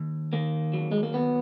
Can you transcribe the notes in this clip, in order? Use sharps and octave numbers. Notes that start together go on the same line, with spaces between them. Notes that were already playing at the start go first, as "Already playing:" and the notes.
Already playing: D#2
D#3 A#3
F#3
G#3
A#3
D#2 B3